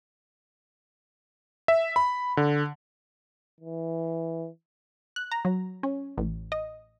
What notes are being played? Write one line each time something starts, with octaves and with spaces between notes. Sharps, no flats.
E5
B5
D3
E3
F#6
A#5
F#3
C#4
A1
D#5